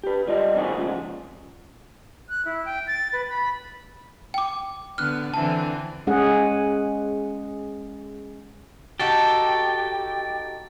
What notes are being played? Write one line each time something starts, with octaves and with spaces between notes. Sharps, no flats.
G4 B4
C2 G3 F4 D#5 G5
C3 D#3 F3 C4 F#4 G#4
A#2 C#3 F3 G#3
F#6
E4
G5
A6
B4
B5
G5 D6
D3 B3 F6 F#6
D3 E3 C4 A5
G#3 C#4 G#4 F#5
D#4 F#4 G4 A4 A6